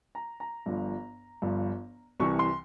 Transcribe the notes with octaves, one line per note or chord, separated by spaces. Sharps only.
A#5
A#5
G1 G2 F3
G1 G2 F3
C2 C3 E3 C#6
C6